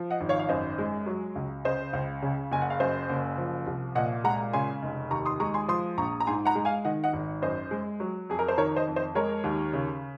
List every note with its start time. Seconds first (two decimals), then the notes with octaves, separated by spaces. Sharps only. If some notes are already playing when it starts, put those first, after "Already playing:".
Already playing: F3
0.11 D#5 F#5
0.21 G#1
0.29 C#5 F5
0.40 F5
0.49 F#2 C5 D#5
0.78 G#3
1.06 F#3
1.36 C#2
1.65 C#3 C5 D#5
1.93 C#2
2.22 C#3
2.51 F#1 G#5
2.62 F#5
2.70 F5
2.80 F#2 C5 D#5
3.10 F#1
3.38 F3
3.67 C2
3.95 A#2 D#5 F#5
4.24 G#3 F#5 A#5
4.53 C#3 G#5 C6
4.83 F1
5.11 D#2 A#5 C#6
5.26 C6 D#6
5.40 G#3 A#5 C#6
5.54 G#5 C6
5.68 F3 C6 D#6
5.97 A#1 A#5 C#6
6.20 A#5
6.27 G#2 G#5 C6
6.45 F#5 A#5
6.55 G#3
6.65 F5 G#5
6.85 D#3 D#5 F#5
7.04 D#5 F#5
7.13 G#1
7.42 F#2 C5 D#5
7.71 G#3
8.00 F#3
8.30 F2 G#4
8.39 A#4
8.48 C5
8.58 D#3 A#4 C#5
8.76 C5 D#5
8.87 F2
8.96 C5 D#5
9.15 G#3 A#4 C#5
9.44 D#2
9.73 C#3